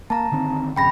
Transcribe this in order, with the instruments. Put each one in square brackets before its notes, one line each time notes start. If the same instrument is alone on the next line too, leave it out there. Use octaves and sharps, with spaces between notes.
[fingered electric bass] A#3 [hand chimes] A5 A#5
[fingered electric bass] D3 D#3 C4
[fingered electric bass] G#1 F2 C#3 [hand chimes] G5 B5 A#6